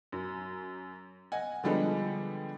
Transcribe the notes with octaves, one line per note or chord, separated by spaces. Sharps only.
F#2
D#5 F#5 G#5
D3 F3 G3 G#3 B3 A4